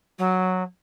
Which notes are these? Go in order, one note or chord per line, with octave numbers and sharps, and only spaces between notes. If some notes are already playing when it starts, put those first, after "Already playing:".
F#3